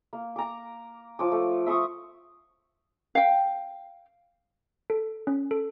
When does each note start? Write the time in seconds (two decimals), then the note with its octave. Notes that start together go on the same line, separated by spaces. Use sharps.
0.13 A#3
0.36 A#5 D6
1.19 F3 D6
1.32 A3
1.66 E5 C6 C#6 D#6
3.15 F5 G5
4.90 A4
5.27 C#4
5.51 A4